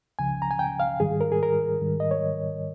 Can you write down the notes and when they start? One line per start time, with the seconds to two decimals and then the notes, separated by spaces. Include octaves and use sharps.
0.19 C#2 C#3 F3 G#5
0.42 A#5
0.51 G#5
0.59 G5
0.80 F5
1.00 G#2 D#3 G3 G#4
1.21 A#4
1.32 G#4
1.43 A#4
1.81 G#2 D#3 G3
2.00 D#5
2.11 C#5